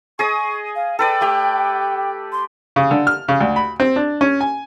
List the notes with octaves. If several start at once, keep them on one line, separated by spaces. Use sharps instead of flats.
G#4 D#5 C#6 D#6
F5
A4 B4 D5 G5
A3 G4
C6
C#3
D3
F6
C#3
D2
B5
C4
D4
C#4
G#5